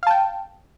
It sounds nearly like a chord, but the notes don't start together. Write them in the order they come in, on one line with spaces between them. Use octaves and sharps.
F5 A5 G5